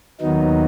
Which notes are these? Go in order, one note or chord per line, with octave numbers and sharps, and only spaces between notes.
D#2 D#3 F#3 B3 D#4